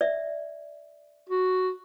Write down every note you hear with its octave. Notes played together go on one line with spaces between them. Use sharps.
D5 E5
F#4